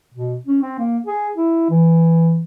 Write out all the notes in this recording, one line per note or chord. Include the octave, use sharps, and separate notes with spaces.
B2
C#4
C4
A#3
G#4
E4
E3